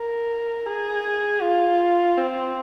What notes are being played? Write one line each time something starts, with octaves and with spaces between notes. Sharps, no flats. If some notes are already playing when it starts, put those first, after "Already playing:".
Already playing: A#4
G#4
F4
C4